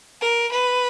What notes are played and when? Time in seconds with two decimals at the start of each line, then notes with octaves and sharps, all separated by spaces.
0.21 A#4
0.52 B4